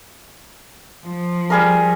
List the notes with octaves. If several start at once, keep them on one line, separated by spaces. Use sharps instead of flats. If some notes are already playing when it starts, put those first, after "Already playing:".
F3
G3 G#4 A#4